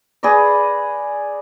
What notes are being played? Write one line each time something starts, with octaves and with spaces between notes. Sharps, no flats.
G#4 B4 D5 D#5